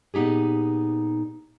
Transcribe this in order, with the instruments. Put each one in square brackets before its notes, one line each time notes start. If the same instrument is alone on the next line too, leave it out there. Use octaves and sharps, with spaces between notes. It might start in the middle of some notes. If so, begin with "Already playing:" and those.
[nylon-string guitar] A#2 B3 D#4 G4 G#4